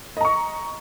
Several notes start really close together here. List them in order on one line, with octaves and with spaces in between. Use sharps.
D#5 A#5 C#6